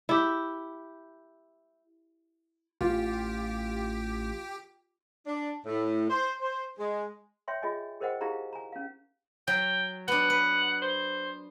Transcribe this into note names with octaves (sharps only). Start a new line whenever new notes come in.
E4 G4
A1 F4 G4
D4
A2
C5
C5
G#3
C#5 E5 G5 C6
F4 G#4 D#5 G#5
G#4 A#4 C5 D#5 F#5 G5
D#4 E4 G4 G#4 F5 A#5
G#5 A#5
C#4 F5
F#3 G5
B3 D4 F#5
B4
C5